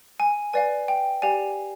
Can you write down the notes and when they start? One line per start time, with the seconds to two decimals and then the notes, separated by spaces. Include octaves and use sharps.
0.20 G#5
0.53 B4 D5 F5 G#5
0.88 G5
1.22 G4 D5 F5 G#5